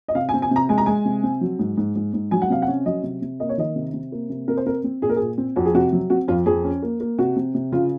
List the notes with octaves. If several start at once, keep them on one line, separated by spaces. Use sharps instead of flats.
D#5
C3 F5
G#5
C4
G#5
C3 A#5
G#3 G#5
A#5
G#3 G#5
C3
C4
F#3
G#2
G#2
G#2
G#2
F#3 G#5
F#5
C3 F5
F#5
C#4
F#3 D#5
C3
C3
A#3 D#5
C#5
D#3 D#5
C3
C3
A#3
C3
C4 A#4
C5
C4 A#4
C4
A#2 G#4
A#4
A#2 G#4
C4
F2 F#4
G#4
C3 F#4
F#3
C4 F#4
F2 F4
F2 G#4
C#4
A#3
A#3
C3 F#4
C3
C3
C#3 F4